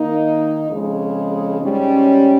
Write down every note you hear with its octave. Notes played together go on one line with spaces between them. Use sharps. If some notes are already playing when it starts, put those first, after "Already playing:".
Already playing: D#3 A#3 D#4
F2 C#3 G#3
G#2 G3 C#4